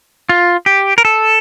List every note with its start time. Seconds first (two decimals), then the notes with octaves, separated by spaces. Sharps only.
0.29 F4
0.66 G4
0.98 A#4
1.05 A4